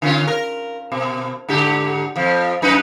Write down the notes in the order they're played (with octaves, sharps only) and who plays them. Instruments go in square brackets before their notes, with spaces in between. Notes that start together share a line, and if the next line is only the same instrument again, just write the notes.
[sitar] D3 C#4 F4
A#4
B2
G#2 D3 G4
F2 F3
F#2 D#4 B4